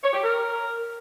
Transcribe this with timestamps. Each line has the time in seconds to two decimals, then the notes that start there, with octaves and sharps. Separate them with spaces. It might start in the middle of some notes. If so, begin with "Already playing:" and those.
0.03 C#5
0.13 G4
0.23 A#4